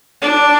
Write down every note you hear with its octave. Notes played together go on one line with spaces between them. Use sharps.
D4